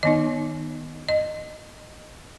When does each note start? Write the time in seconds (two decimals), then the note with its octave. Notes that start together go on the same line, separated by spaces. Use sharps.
0.03 D#3 B3 D#4 D#5
1.09 D#5